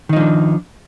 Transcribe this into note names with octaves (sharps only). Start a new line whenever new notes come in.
D#3 F3 D4 D#4